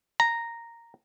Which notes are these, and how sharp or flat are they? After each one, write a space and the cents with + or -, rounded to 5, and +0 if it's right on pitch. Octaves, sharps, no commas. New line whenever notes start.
A#5 -5